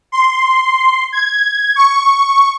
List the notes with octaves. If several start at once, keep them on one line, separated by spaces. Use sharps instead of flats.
C6
G#6
C#6